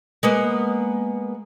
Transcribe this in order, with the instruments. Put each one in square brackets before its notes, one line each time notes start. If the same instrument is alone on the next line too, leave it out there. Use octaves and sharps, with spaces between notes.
[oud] G#3 A#3 B3